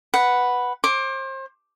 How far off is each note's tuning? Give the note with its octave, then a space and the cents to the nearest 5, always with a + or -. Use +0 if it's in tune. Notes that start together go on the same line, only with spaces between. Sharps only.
B4 +0 F#5 +0
C5 +35 D6 +0